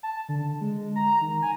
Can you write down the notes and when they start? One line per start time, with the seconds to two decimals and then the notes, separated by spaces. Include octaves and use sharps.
0.03 A5
0.29 D3
0.61 G#3
0.96 A#5
1.21 D#3
1.42 G#5